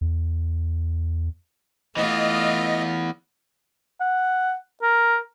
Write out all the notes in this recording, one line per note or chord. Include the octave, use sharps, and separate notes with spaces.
E2
E3 A3 B3 F4 D#5
F#5
A#4